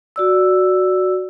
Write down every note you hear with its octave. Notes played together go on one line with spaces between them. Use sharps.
F#4 D5 E6